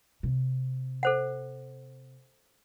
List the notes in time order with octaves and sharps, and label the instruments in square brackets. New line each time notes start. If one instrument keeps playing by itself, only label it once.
[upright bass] C3
[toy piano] A4 C5 F#5